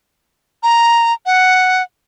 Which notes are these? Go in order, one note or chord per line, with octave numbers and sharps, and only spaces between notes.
A#5
F#5